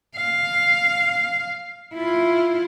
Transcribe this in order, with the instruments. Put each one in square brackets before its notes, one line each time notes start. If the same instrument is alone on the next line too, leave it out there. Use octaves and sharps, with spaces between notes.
[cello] F5
E4 F4